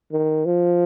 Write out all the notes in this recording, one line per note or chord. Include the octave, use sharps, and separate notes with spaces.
D#3
F3